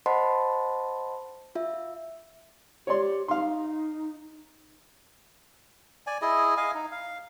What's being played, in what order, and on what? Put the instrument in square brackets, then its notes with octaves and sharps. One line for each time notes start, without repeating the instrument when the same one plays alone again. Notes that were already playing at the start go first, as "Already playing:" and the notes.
[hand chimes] C5 D#5 F#5 A5 B5 C6
F4 E5
[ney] G4 [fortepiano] C#5 D5 C6
[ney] D#4 [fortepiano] F5 C6
[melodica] D5 G#5
E4 G#4 D#5
D#5 F5 G#5
D#4
F5